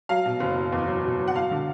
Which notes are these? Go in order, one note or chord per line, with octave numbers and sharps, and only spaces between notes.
F#3 F5
B2
F#1
F#3
E2
F#3
B2
F#3
F#5
F#3 F5
D3